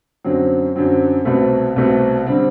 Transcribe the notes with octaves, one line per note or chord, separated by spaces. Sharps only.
F#2 D3 F#3 C4
F#2 D3 F#3 C4
C2 B2 A3 C4
C2 B2 A3 C4
D3 G3 C4